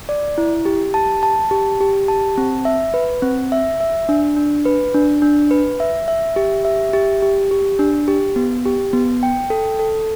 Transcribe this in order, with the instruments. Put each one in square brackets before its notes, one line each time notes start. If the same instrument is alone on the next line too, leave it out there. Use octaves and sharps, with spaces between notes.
[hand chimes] D5
E4
G4
A5
A5
G4
G4
A5
C4
E5
B4
C4
E5
E5
D4
D4
B4
D4
D4
B4
E5
E5
G4
E5
G4
G4
G4
D4
G4
B3
G4
B3
G5
A4
A4